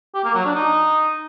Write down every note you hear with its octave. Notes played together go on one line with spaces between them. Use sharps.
G4
A#3
F#3
D4
D#4